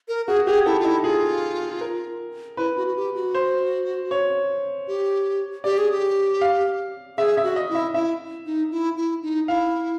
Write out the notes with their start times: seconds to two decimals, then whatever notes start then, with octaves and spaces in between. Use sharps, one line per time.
0.08 A#4
0.27 F#4 G#4
0.39 F#4
0.46 G4 G#4
0.66 E4 A4
0.80 F4
0.85 D#4 E4
1.03 F4 G#4
1.81 A#4
2.57 E4 B4
2.76 F#4
2.87 F#4
2.96 G4
3.15 F#4
3.35 C5
4.11 C#5
4.88 G4
5.64 G4 D5
5.78 G#4
5.91 G4
6.41 F5
7.18 G#4 E5
7.37 E5
7.43 F#4
7.56 D#5
7.69 E4
7.75 E5
7.94 E4 E5
8.46 D#4
8.72 E4
8.97 E4
9.23 D#4
9.48 E4 F5